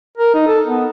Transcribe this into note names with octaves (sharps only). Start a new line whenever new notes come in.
A#4
D#4
A4
B3